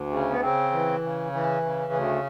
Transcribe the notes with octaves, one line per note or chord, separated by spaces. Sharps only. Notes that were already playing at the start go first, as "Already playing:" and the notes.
Already playing: D2
C#3
B3
C#3 C4
E3
C#3
E3
C#3
D2